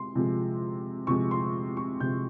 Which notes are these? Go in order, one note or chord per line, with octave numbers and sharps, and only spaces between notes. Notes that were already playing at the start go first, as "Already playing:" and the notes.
Already playing: C3 G#3 C6
C3 F3 G#3
C3 F3 G#3 C#6
C6
C#6
C3 F3 G#3 G6